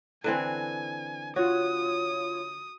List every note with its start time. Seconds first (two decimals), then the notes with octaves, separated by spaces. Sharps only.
0.24 D3 E3 C4 G#5
1.36 F4 F#4 C#5 D#6